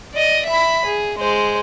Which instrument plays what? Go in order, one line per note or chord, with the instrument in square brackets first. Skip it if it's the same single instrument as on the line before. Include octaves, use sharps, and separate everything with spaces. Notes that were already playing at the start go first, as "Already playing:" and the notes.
[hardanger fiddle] D5 D#5
E5 B5
G#4
G#3 C5